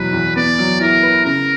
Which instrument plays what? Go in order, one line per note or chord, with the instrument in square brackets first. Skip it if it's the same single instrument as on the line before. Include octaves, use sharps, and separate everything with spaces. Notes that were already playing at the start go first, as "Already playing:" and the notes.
Already playing: [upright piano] E2 B2 F#3 [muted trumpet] B4
[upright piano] E2
[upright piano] B3 [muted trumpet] D5
[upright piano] F#3
[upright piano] E4 [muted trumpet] A#4
[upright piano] B4
[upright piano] C#3 [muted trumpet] A#4